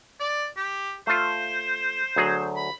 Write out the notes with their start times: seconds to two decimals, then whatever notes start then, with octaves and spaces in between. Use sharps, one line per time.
0.20 D5
0.57 G4
1.07 A3 F4 C5
2.16 D2 F#3 G#4
2.56 B5